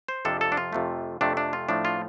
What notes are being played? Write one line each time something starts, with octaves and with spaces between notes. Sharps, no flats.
C5
F2 C3 F3 D4 A4
A4
D4
F4
F2 C3 A3
F2 C3 A3 D4
D4
F4
A2 F3 A3 D4
F4